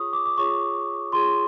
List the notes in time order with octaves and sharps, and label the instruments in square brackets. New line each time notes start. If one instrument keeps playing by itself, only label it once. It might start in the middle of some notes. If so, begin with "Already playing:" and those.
Already playing: [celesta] F4 G#4 C#5 C#6 D#6
D6
D6
F4 G#4 C#5 C#6
F4 G#4 C#5 C6